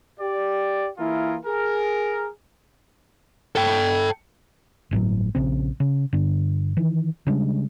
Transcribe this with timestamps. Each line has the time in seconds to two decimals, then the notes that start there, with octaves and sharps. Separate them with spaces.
0.20 G4 D5
0.98 E3 A#3 E4 F4 G#4 A#4
1.45 G#4 A#4
3.56 A4 G5
4.91 G1 A2 C3 F#3
5.35 A#1 C#3 C4
5.80 C#3
6.13 G2 D3
6.77 D#3 E3
7.27 C#3 G3 G#3 D4